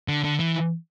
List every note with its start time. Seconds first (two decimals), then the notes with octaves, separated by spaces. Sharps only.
0.08 D3
0.24 D3
0.40 E3